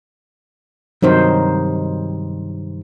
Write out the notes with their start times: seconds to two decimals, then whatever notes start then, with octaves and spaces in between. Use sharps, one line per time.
1.02 G2 C3 D#3 F#3 D#4 C5